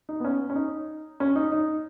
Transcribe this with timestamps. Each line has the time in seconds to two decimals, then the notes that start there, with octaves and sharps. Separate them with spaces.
0.09 D#4
0.20 B3
0.24 C#4
0.50 C#4
0.56 D#4
1.20 C#4
1.36 D#4
1.52 D#4